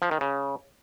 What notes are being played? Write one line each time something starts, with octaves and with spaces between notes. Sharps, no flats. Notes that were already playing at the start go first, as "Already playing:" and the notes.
F3
D#3
C#3